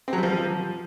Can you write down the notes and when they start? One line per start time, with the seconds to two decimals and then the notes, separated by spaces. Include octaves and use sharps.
0.08 C4
0.13 F#3
0.18 G3
0.23 F3